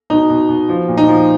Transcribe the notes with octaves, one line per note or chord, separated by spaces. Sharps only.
B2 D#4
B2
B2
F3
A#2
D#4
F3